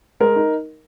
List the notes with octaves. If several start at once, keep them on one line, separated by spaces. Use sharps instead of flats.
G#3 A#4
D#4